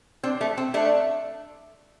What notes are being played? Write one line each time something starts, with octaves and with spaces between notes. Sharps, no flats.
C4 D4
A3
C4
A3 D4 E5